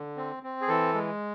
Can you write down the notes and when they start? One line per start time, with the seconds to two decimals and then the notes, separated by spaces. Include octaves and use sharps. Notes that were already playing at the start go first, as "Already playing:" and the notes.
Already playing: D3
0.17 C4
0.43 C4
0.61 G#4
0.68 E3 A4
0.94 G#3